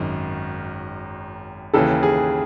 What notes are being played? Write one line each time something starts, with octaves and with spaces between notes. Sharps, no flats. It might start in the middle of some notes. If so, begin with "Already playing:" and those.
Already playing: G#1 F#2 D#3
D#2 C#3 E3 A4
G#4